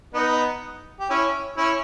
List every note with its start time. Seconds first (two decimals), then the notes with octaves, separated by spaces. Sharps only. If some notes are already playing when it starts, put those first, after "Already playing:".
0.14 B3 D#4
1.00 G4
1.10 C#4 E4
1.57 C#4 E4